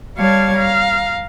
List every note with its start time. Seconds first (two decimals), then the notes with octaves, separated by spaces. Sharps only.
0.18 G3 C#5 F5 A5 G#6
0.56 F5 A#5